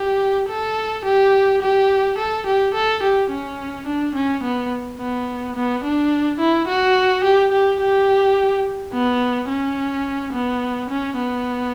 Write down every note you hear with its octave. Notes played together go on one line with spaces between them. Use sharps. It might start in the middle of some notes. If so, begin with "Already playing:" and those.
Already playing: G4
A4
G4
G4
A4
G4
A4
G4
C#4
D4
C#4
B3
B3
B3
D4
E4
F#4
G4
G4
G4
B3
C#4
B3
C#4
B3